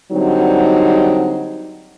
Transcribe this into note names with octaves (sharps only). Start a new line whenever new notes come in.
D3 F#3 G3 C4 D#4